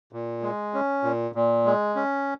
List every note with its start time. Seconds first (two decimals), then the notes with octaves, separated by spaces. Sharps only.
0.13 A#2
0.42 G#3
0.74 C#4
1.04 A#2
1.35 A#2
1.65 G#3
1.96 C#4